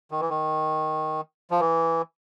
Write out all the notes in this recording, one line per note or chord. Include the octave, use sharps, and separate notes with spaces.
D#3
E3
D#3
F3
E3